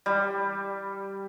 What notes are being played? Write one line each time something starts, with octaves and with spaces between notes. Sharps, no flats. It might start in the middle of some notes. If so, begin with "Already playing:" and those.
G3